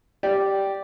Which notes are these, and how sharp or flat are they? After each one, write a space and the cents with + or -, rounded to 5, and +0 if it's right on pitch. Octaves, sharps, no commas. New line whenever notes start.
G4 -5 D5 +0